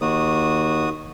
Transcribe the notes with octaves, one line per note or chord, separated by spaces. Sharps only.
D#2 F#4 D#6